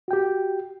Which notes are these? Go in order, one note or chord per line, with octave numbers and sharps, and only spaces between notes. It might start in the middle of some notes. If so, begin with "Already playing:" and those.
F#4 G4 G5